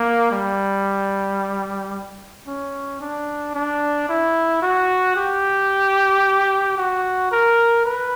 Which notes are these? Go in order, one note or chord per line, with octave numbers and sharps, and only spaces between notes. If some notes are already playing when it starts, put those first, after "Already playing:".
Already playing: A#3
G3
C#4
D4
D4
E4
F#4
G4
F#4
A#4
B4